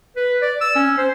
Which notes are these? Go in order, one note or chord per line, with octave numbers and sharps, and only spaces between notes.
B4
D5
E6
C#4
C5